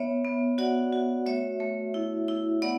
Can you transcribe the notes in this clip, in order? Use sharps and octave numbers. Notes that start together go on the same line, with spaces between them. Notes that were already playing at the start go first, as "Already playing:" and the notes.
Already playing: B3 C#5 E5
B3
F#4 D5 F#5
F#4
A3 C#5 E5
A3
E4
E4
B3 D5 F#5